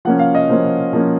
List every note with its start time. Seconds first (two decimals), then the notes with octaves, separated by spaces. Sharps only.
0.05 F3 A#3 C#4 F#5
0.19 F5
0.35 D#5
0.49 F3 A#3 C#4 C5
0.93 F3 A#3 C#4